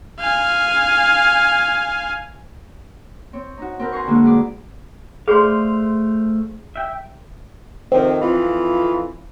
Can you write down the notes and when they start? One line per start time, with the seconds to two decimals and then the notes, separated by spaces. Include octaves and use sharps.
0.20 F5 G#5
3.33 C4 C#5
3.58 D#4 F#4
3.79 C4 A#4 B4
3.92 F#5 G#5 A#5 C6 C#6
4.07 A#2 D3 G3 G#3 A#3 F#4
4.24 G#4 B4 D5
5.28 A3 G#4 C5 D5 F5 C6
6.76 E5 G5
7.92 F2 C3 D#3 C4
8.21 F2 E3 F4